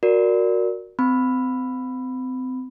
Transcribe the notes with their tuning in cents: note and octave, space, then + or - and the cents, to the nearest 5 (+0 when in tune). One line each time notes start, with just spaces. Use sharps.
F#4 -10 A#4 +0 D5 -10
C4 -30 B5 +5 E6 +30